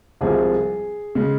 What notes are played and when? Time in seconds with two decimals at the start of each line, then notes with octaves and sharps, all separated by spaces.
0.21 C2 C3 F3 G#3 G#4
1.15 C#3 G#3